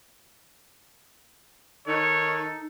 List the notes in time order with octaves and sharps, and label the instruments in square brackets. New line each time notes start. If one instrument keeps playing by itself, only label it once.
[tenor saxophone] D#3 [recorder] D#4 [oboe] A4 [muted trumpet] C#5